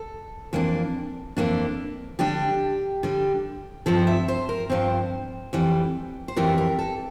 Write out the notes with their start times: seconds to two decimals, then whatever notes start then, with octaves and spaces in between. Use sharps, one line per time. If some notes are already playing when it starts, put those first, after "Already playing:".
Already playing: A4
0.53 F2 E3 A#3 D4
1.37 F2 E3 A#3 D4
2.19 D3 G3 D4 G4
3.03 D3 G3 D4
3.86 G2 F3 C4 A4
4.07 E5
4.28 C5
4.49 A#4
4.70 G2 F3 C4 C5
5.53 F2 E3 G3
6.28 C5
6.37 F2 E3 G3 A#4
6.58 A#4
6.79 A4